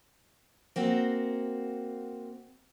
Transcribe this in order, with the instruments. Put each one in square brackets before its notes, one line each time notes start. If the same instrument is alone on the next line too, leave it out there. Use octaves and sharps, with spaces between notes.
[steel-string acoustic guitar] A#3 C4 F#4